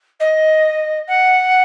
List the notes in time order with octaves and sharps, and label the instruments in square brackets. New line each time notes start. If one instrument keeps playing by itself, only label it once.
[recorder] D#5
F#5